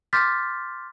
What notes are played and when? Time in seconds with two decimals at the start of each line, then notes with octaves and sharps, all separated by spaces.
0.13 C6 D6 F6 G6 A6 B6